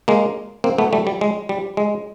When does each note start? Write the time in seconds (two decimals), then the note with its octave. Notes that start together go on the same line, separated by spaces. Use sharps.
0.08 G#3 A#3
0.64 A#3 C4
0.78 A3 B3
0.93 G3 A3
1.07 G3
1.21 G#3
1.49 G3
1.77 G#3